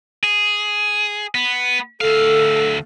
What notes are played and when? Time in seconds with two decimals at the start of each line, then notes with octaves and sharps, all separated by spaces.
0.23 G#4
1.35 B3
2.01 D2 A4 F5